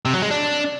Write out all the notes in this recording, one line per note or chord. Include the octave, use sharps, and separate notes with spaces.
C3
F#3
G#3
D4